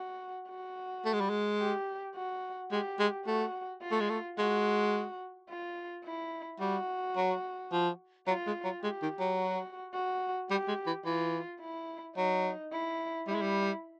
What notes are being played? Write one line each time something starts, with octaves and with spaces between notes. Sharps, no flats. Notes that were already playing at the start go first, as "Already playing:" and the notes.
Already playing: F#4
F#4
A3
G#3
G3
G#3
G4
F#4
G#3 G4
G#3
A3 F#4
F4
A3
G#3
A3
G#3 F#4
F4
E4
G3 F#4
F#3
F3
F#3 F4
G#3
F#3
G#3 G4
D#3
F#3
F#4
F#4
G3 G4
G#3
E3
E3 F4
E4
F#3 D#4
E4
G3 E4
G#3
G3